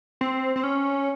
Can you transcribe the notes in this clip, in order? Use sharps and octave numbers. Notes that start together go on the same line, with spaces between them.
C4
C4
C#4